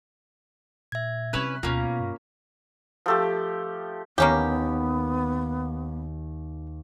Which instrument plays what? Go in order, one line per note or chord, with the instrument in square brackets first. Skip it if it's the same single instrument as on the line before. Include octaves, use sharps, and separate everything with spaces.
[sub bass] A#2 [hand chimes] E5 G#6
[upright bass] C3 G3 [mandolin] C#4 E4 B4 [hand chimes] F#6
[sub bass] D2 [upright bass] B2 B3 [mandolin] A#3 C#4 [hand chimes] F4 F5
[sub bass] G2
[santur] F3 A3 G4
[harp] D#2 [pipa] A#3 C#4 G4 [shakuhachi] B3